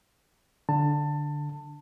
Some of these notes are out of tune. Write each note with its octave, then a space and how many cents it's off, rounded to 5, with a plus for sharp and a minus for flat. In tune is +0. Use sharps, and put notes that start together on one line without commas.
D3 +0 A5 +20